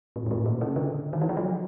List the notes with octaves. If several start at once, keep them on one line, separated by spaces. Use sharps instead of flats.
A2
G#2
A2
A#2
C#3
D3
D#3
E3
F3
F#3